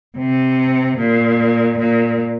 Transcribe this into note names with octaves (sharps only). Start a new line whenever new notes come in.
C3
A#2
A#2